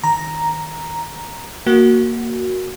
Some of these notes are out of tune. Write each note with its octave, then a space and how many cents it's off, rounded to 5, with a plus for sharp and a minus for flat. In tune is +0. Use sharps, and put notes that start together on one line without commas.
D#3 +0 A#5 +0
A#3 +0 F#4 +0